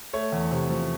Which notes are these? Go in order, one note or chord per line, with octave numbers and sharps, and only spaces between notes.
A3 C#5
E2
C3
F3